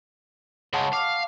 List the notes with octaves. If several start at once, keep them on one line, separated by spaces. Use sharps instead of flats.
C#3 G#3 F#5 A5 C#6
F5 D6